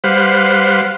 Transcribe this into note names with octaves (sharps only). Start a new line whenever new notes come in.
G3 B4 C5 F5 F#5